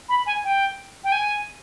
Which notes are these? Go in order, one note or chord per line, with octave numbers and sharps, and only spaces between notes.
B5
G#5
G5
G5
G#5